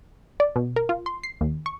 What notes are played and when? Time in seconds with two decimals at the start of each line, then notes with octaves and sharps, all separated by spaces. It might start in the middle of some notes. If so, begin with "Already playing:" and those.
0.40 D5
0.56 B2
0.76 A#4
0.89 F4
1.06 C6
1.24 C7
1.41 D#2
1.66 C#6